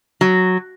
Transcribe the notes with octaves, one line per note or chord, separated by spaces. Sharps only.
F#3